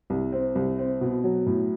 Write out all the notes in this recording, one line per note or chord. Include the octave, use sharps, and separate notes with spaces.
C2
C4
C2
C4
B2
F#3
A2